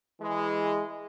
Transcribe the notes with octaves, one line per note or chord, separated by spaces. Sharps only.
E3 G#3